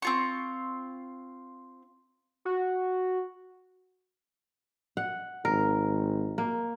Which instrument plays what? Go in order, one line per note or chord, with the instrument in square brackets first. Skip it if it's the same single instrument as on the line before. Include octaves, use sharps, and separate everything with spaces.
[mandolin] C4 F4 C#6
[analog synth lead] F#4
[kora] F#5
[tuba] G#1 [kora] A#4
[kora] A#3